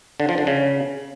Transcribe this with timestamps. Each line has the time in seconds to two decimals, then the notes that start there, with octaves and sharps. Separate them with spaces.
0.20 D3
0.29 F3
0.38 D3
0.47 C#3